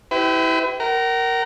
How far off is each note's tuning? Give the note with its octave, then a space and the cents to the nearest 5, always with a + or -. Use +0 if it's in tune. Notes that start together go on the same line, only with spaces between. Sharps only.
E4 -15 G4 -20 B4 +40
A#4 +0 F#5 +45